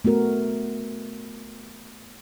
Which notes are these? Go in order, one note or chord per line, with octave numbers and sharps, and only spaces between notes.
A3 B3 F#4 A#4